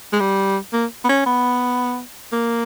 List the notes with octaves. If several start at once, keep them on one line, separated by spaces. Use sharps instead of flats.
G#3
G3
A#3
B3
C#4
B3
A#3